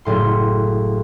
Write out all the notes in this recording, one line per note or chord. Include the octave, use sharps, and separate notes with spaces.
F#1 A2 C6